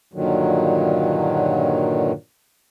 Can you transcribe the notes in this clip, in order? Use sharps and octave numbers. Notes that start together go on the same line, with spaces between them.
G2 A#2 D3 D#3 F#3